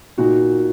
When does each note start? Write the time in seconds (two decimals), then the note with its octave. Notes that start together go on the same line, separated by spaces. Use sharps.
0.18 A#2 D#4 F#4